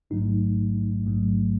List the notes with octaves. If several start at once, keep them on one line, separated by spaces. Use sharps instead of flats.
A1 G#2 F#3 A3 D#4
A1 G#2 F#3 A3